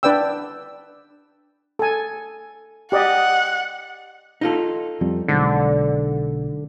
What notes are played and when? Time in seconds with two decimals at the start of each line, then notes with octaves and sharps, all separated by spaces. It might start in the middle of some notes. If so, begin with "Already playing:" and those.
0.03 D4 B4 D5 G5 E6
1.79 A4 G#5
2.92 G4 D5 D#5 F#5
4.41 D#4 F4 A4
5.01 F2 G3
5.28 B1 G#2 D3